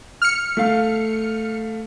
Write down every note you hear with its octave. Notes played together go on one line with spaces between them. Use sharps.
F6 C#7
A3 F5